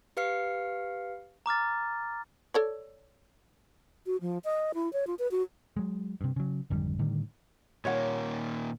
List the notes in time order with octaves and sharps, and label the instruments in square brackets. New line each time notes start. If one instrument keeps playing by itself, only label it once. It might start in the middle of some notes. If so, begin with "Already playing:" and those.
[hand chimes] G4 B4 F5 F6 C7 C#7
[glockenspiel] A#5 D6 F6 A6
[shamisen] A4 C#5 D5
[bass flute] F#4
F3
D#5
E4
C#5
F4
B4
F#4
[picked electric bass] F#3 G#3
G2 C3
C#3 F#3
G#1 F2 D3 G3
A2 D3 D#3 G3
[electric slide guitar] A#2 D#3 A#3 [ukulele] C#5 F#5